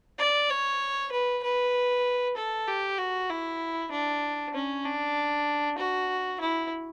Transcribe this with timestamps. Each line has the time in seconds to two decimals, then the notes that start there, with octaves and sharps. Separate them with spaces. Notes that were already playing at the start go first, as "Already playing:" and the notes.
0.19 D5
0.50 C#5
1.12 B4
1.43 B4
2.37 A4
2.68 G4
2.98 F#4
3.29 E4
3.92 D4
4.54 C#4
4.85 D4
5.78 F#4
6.41 E4